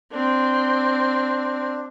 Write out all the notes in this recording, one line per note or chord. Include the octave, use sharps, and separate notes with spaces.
C4 D4